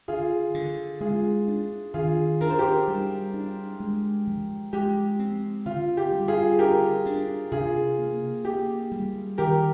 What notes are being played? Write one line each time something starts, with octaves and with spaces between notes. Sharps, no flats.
D3 F4 G#4
D3
G#3 F4 G#4
D4
D#3 F4 G#4
D4 A#4
C5
G4 A#4
G3
D4
G#3
F3
G#3 G4
C4
D3 F4
G4
G3
F4 G#4
D4 G4 A#4
D4
C3 F4 G#4
A#3
A#3 G4
G3
D#3 G4 A#4